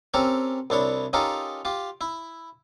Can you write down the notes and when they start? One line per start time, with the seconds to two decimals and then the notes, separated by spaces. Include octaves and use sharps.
0.14 C4 C#4 G4 A4 A#4
0.70 C2 D4 E4 C#5
1.13 C#4 D#4 F4 G4 A4 A#4
1.65 F4 G4
2.01 E4